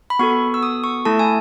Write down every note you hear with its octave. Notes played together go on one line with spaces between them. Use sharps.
B5
B3 F#4 A4 C#6
E6
D#6
C#6
A3 E4 A4 A5
G#5